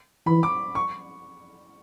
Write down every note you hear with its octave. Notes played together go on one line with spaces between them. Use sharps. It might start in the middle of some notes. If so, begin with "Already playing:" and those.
E3 B5
D6
C#6